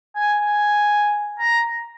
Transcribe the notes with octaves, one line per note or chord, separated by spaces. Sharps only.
G#5
G#5
A#5